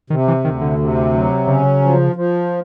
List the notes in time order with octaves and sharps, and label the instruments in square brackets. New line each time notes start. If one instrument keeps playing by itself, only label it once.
[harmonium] C3 [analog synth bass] D#3
[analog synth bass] E3
[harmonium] D2 [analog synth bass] D#3
[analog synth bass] D3
[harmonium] C3
F#3
[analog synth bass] C#3 [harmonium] C#4
[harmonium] F3
F3